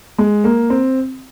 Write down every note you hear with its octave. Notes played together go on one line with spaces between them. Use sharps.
G#3
A#3
C4